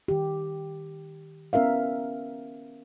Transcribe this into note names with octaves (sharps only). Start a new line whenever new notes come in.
D#3 G4
B3 C#4 A#4 E5 F5